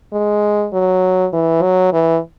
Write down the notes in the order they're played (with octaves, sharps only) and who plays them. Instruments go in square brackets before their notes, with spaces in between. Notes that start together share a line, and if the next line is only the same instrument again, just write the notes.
[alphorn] G#3
F#3
E3
F#3
E3